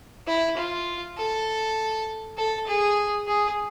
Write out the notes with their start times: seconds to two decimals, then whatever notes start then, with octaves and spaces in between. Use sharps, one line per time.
0.27 E4
0.57 F4
1.17 A4
2.37 A4
2.67 G#4
3.27 G#4